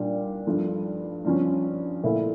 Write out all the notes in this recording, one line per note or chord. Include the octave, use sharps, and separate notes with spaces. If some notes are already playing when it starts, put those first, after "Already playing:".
Already playing: A#2 G3 D4
G2 F3 A3
G2 F3 C#4
A#2 A3 E4